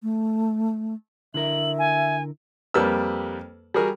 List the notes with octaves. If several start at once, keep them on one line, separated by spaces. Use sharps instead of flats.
A3
D3 E4 A#4 E5 F#7
G#5
F2 G3 A#3 B4 E6
G3 F#4 G#4 A#4